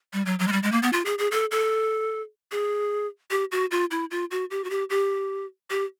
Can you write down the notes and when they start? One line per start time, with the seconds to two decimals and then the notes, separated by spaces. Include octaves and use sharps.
0.13 G3
0.26 F#3
0.39 F#3
0.48 G#3
0.52 G3
0.63 G#3
0.72 A#3
0.83 B3
0.93 F4
1.05 G#4
1.19 G#4
1.31 A4
1.51 A4
2.52 G#4
3.31 G4
3.52 F#4
3.71 F4
3.91 E4
4.11 F4
4.31 F#4
4.51 G4
4.64 F#4
4.70 G4
4.90 G4
5.70 G4